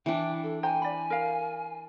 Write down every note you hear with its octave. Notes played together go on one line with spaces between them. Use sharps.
E3 D4 G5
A4
C5 G5 G#5 A#5
D5 B5
A#4 F5